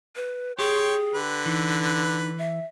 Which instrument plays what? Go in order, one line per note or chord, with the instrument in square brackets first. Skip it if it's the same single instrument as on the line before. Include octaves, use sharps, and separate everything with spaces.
[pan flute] B4
[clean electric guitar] G4 [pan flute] G#4 [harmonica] C#5 G5 C6
[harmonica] D3 B4
[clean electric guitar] E3 [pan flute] D#4
[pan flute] E5